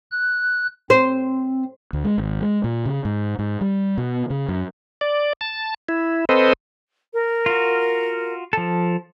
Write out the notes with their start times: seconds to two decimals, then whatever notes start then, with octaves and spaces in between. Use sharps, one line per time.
0.11 F#6
0.90 C4 C5
1.93 D2
2.04 G#3
2.18 G#1
2.41 G#3
2.64 A#2
2.86 C#3
3.05 G#2
3.39 G#2
3.61 G3
3.98 B2
4.30 C#3
4.48 F#2
5.01 D5
5.41 A5
5.89 E4
6.29 C4 A4 B4 C5 D#5
7.14 A#4
7.46 F4 F#4
8.53 F3 A4